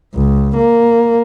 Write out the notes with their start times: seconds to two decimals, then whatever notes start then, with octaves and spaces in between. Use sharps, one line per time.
0.15 C#2
0.57 A#3